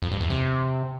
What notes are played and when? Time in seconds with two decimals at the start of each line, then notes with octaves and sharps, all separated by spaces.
0.02 F2
0.11 G2
0.21 E2
0.30 C3